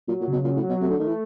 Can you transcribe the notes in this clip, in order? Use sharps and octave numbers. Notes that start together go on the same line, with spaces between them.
A#2 F#3
A#2
C#3
B2
A#2 F#3
A2
F#3
B2
C3 A3
D3
D#3 A3
E3